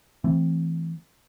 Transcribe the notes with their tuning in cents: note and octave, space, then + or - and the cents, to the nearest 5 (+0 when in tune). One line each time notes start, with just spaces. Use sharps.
E3 +0 A3 +0 C4 +0